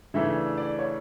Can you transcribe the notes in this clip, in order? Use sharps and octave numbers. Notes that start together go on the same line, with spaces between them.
C#3 E3 A3 D4 E5
D5
D5
C#5